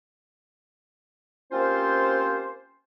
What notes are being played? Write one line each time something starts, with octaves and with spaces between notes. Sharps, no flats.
A#3 C4 C#4 F4 G4 C5